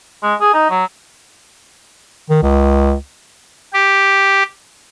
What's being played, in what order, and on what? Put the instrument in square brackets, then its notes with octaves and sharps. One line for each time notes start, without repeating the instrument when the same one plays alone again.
[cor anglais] G#3
G#4
D#4
F#3
[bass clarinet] D#3
C#2
[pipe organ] G4